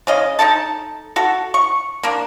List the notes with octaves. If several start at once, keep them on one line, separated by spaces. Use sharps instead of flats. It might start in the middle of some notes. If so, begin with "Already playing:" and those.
C#3 C#4 D#5
D#4 E4 A4 A5
F#4 A4
C#6
A#3 D4